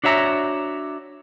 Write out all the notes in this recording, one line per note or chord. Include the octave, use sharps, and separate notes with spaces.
D4 F#4 C#5 E5 A#5